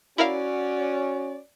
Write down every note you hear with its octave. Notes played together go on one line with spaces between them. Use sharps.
C#4 E4 F#4 A#4 D5 F5